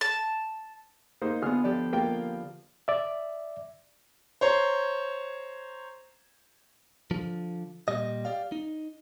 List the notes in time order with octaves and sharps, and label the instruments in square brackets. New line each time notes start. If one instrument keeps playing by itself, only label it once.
[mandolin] A5
[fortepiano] A#3 D#4 C5
[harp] D3 B3 [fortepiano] F4 G#4 F6
[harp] F3 G4 A4 [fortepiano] D5
[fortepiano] A#3 G5 [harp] F4
[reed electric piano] D5 E5
[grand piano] C5 C#5 A#5
[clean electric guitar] D3 F3
A#2 G3 D#5
G4 D5 F5
D#4